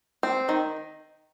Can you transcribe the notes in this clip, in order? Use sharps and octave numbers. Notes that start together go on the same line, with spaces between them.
C4
D#3